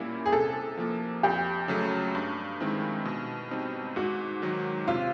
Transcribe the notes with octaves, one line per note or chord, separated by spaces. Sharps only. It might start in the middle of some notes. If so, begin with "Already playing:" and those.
Already playing: A#2 G3 A#3 C#4 E4
G#4
C3 A4
F3 A#3
F2 G4
C#3 F#3 A3
G2
D#3 G#3 C4 E4
B2
G3 C4 D#4
G#2 F#4
D#3 F#3
C3 F4